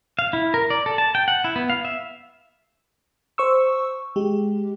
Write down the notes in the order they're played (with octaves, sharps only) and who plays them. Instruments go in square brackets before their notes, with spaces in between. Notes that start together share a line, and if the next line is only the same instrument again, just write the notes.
[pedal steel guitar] F5
E4
A#4
D5
A4
A5
G5
F#5
E4
B3
F5
E5
[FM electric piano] C5 C#6 E6
G#3 G4